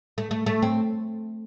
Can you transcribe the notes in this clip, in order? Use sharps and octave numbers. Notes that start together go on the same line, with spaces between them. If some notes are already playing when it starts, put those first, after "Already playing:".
A3
A3
A3
C4